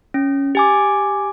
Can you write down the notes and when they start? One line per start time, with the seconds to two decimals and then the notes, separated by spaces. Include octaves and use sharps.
0.14 C#4
0.55 G4 G#5 D6